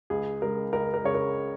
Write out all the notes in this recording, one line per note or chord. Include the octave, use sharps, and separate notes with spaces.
C#2 G#4
C#3 G#3 A#4
C#2 A#4
A#4
C#3 G#3 C#5
A#4